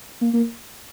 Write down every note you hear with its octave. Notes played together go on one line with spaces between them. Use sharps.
A#3
A#3